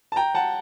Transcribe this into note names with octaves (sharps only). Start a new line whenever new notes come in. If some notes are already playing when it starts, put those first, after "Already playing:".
A5
G5 A#5
F#5 A5